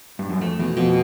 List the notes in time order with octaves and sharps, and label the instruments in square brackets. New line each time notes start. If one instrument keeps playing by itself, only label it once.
[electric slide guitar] G2
F#2
[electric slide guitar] F2 [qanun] A3
[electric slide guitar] E2 [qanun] B2
[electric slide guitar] F2 [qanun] B2